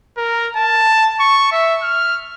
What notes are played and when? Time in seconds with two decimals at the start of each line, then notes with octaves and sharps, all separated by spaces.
0.17 A#4
0.56 A5
1.20 C#6
1.52 E5
1.83 F6